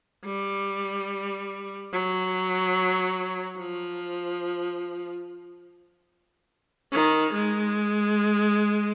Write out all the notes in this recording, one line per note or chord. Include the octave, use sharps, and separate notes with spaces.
G3
F#3
F3
D#3
G#3